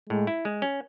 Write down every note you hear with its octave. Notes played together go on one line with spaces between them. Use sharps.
A2 G#3
E4
G#3
C#4